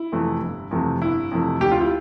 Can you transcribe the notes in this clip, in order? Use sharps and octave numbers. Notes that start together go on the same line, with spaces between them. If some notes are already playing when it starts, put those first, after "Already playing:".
Already playing: E4
F2 C3 E3 A3
G1
F2 C3 E3 A3
G1 E4
F2 C3 E3 A3
D2 G4
F4
E4